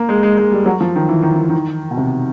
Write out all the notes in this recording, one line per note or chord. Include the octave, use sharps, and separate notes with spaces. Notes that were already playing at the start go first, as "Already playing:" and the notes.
Already playing: A#3
G#3
G#3
G#3
G3
F#3
F3
D#3
E3
D#3
E3
D#3
B2
C3